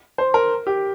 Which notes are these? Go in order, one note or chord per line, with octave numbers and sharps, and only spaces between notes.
C5
A#4
G4